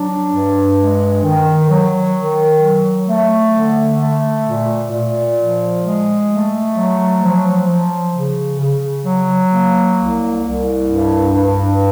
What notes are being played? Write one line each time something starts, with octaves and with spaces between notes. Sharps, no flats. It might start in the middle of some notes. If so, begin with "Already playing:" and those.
Already playing: F#3 D4
G2
G#3
D#3
F#3
D#3
F#3
A3
D3
A3
A#2
A#2
F3
G#3
A3
F#3
F3
F3
C#3
C#3
F#3
A#3
C2
C2
G2
G2